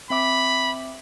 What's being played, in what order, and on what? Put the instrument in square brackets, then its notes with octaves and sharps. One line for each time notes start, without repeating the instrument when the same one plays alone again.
[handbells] C4 E5 D6 [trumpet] B5